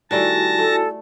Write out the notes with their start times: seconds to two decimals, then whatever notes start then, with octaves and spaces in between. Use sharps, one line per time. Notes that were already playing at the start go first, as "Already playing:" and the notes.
0.11 D#3 G3 A3 E4 F#4 G#5 A5 A#6
0.58 A3 A4